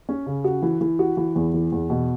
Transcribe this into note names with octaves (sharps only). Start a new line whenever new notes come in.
C#4
C#3
F#4
E3
E3
F#4
E3
E2
E3
E2
B2